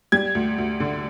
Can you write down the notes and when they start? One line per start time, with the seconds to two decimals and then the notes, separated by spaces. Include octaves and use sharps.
0.12 G3 G#6
0.35 D2
0.58 D2
0.80 D3